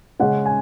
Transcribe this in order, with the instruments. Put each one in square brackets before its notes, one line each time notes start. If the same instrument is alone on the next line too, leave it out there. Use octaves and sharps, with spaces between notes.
[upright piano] C#3 G#3 C#4 [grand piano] F#5
[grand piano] G#5